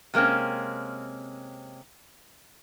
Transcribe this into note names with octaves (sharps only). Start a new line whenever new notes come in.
C3 G#3 A#3 C4 C#4